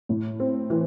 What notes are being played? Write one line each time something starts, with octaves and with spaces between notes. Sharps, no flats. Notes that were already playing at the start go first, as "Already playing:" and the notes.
A2
C4
E3